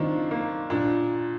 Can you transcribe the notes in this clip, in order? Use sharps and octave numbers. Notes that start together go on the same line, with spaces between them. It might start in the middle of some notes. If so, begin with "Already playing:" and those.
Already playing: D#3 A#3 C4 D4 F4
A#3
A#2 D4